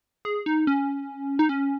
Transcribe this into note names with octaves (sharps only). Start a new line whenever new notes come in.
G#4
D#4
C#4
D#4
C#4